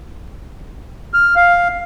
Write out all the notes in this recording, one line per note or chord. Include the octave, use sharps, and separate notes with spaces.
F6
F5